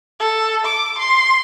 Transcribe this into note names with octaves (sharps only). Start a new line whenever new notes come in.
A4
D6
C6